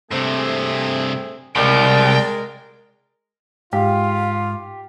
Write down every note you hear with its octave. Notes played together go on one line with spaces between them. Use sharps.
G2 C3 A3 C4 G#4
C2 G#3 A#4 D5 G5
G#2 F4 G4 F5